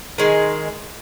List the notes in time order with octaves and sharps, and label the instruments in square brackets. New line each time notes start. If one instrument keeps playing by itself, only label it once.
[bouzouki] D#3 G#3